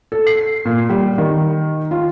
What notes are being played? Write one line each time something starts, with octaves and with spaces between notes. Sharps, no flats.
A4
C7
A#2
G3
D#3
F4